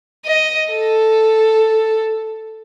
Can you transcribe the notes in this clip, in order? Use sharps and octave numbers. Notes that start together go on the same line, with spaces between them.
D#5
A4